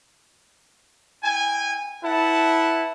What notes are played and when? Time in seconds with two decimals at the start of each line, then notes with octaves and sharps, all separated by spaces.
1.23 E4 G5 G#5
2.04 E4 B4 F#5 A5